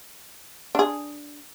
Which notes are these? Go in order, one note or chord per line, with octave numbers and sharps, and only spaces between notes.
D4 G#4